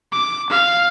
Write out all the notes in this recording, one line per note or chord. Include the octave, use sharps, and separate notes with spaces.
D6
F5